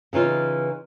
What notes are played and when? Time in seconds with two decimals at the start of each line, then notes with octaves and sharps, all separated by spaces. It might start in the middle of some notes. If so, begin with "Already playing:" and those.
0.13 C#3 E3 D#4 F4